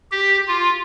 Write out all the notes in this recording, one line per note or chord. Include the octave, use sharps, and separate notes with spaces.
G4
F4